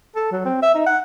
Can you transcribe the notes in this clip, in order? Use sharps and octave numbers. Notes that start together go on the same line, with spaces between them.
A4
F#3
C4
E5
D#4
F#5